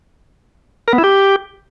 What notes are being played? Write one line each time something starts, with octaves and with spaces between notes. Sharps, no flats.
A#4
B3
E4
G4